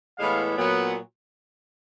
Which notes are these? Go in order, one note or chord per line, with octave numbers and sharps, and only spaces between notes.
A2 E3 G#3 B3 F5
A#2 F#3 B3